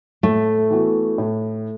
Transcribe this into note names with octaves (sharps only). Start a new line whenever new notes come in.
A2 A3
E3 B3 F#4
A2